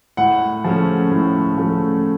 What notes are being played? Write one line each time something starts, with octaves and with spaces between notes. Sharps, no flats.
A2 F#5
F3 A3 C#4
A2
F3 A3 C#4